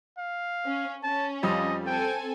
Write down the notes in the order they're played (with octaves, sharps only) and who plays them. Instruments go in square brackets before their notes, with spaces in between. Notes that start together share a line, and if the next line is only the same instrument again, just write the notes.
[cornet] F5
[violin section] C#4
[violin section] C#4 [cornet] A5
[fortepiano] F2 F3 G3 [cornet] D#5
[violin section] C4 A4 G#5 [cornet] G5